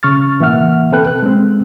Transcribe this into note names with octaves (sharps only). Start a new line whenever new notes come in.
C#3 C#6 F6 A6
A2 E3 A#3 E5 F#5 F6
C4 A4 B4 G5 F#6
F#6
G#3 C4